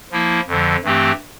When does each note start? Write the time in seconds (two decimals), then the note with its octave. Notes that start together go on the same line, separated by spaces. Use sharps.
0.12 F3 A#3 E4
0.48 F2 D3 F3
0.83 G2 E3 A3 C4 G4